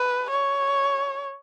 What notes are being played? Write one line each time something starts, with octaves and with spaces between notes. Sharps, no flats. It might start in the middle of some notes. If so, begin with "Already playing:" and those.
Already playing: B4
C#5